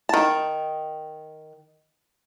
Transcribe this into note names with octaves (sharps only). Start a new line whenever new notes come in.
D#3 A5